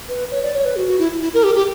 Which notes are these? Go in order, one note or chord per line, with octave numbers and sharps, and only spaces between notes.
B4
C#5
D5
C#5
B4
F#4
F#4
E4
E4
A#4
G4
G4